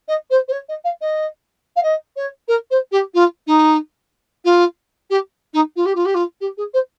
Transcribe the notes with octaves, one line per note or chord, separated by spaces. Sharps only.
D#5
C5
C5
C#5
D#5
F5
D#5
F5
D#5
C#5
A#4
C5
G4
F4
D#4
F4
G4
D#4
F4
G4
F4
G4
F4
G4
G#4
C5